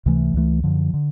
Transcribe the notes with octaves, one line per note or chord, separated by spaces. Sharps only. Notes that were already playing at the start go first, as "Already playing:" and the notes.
C#2 C3 E3 A3
C#2 C3 E3 A3
F#2 D3 F3
D3